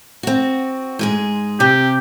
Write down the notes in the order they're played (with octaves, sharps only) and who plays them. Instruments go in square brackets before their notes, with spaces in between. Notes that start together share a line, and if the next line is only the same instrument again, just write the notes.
[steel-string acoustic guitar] C4 F#4
G#2 G#3 G#4
[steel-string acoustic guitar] C3 C4 [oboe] G4